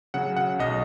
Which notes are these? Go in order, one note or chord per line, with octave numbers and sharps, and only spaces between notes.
C#3 F#3 F#5
F#5
B1 D#5